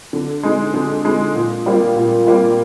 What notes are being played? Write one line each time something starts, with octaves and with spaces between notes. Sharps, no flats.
D3
G#3 D#4
D3
G#3 D#4
A#2
G3 A#3 F4
A#2
G3 A#3 F4